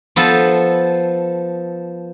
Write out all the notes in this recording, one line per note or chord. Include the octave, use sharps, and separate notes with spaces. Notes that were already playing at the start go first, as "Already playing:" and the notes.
F3 B3 A4 F5